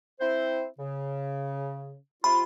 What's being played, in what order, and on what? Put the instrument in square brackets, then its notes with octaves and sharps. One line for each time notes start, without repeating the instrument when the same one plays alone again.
[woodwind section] C4 E4 C5
C#3
[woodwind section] C3 F4 [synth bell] B5